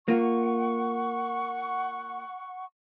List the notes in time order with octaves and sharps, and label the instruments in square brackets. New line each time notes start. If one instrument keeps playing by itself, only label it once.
[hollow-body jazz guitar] A#3 F4 [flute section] F#5 C#6